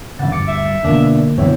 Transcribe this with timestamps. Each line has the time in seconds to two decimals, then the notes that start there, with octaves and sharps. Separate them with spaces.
0.19 C#3 D4 E5 F#5 A6
0.32 D2 G2 D6 A6 C#7
0.48 E5
0.83 B2 D3 A#3 D4 F4
1.38 B2 D3 C4 E4 C#5 E5